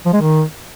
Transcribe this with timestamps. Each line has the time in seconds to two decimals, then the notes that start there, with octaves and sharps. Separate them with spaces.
0.06 F3
0.13 G#3
0.21 D#3